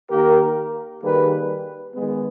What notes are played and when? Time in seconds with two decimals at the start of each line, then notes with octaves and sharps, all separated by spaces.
0.10 D#3 A#3 G4 A#4
1.02 D#3 G3 A#3 G#4 B4
1.95 D#3 G#3 B3